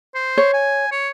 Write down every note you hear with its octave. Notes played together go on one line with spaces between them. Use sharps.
C5
C#5
G#5
C#5